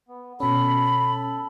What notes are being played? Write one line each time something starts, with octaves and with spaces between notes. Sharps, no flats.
B3
B2 C#4 A4 B5